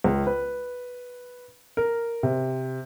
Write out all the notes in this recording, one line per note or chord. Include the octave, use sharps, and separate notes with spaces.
C#2
B4
A#4
C3